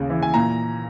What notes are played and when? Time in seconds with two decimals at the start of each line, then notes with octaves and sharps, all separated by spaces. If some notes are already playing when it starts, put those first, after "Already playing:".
Already playing: D#2 C#3
0.10 E3
0.22 G#5
0.34 A#2 A#5